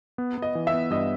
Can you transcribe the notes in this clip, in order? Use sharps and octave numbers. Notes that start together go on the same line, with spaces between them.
B3
B3 D#5
E3
E5
B3
G2 D#5